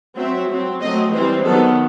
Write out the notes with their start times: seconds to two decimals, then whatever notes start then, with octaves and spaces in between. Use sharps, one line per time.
0.17 F#3 C4 E5
0.50 F#3 C4
0.81 F#3 A3 C4 D#5
1.13 E3 G3 C4 C5
1.45 D#3 F#3 B3 A4